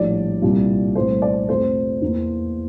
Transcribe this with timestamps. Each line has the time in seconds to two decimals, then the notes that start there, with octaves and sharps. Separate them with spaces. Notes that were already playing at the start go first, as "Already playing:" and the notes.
Already playing: A#1 A2 G3 D5
0.42 C2 A#2 G3
0.95 C2 A#2 A3 C5
1.22 D5
1.48 F2 C3 F3 A3 C5
2.02 E2 E3 A#3